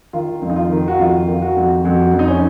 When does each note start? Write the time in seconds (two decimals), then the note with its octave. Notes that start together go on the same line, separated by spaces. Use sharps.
0.13 D#3 F4
0.42 F2
0.50 D#4
0.56 F4
0.71 D#3
0.88 F#4
0.99 F2 F4
1.27 D#3
1.42 F#4
1.56 F2
1.85 F2 F#4
2.13 F2
2.19 D#4
2.28 C#4